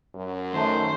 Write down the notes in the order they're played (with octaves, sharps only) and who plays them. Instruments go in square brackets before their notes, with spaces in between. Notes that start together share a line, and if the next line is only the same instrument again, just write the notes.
[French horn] F#2
[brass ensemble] D#3 A3 [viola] C5